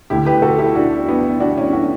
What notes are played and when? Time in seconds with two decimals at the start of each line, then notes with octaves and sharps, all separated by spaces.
0.10 D2 D3 E4 G4
0.26 G4 B4
0.42 F#4 A4
0.58 E4 G4
0.75 D4 F#4
1.09 B3 D4
1.40 D4 F#4
1.57 C#4 E4
1.73 D4 F#4